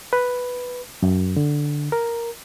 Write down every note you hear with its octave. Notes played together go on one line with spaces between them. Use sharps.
B4
F#2
D3
A#4